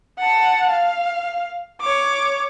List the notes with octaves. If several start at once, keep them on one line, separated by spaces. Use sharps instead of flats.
F#5 A5
F5
C#5 D6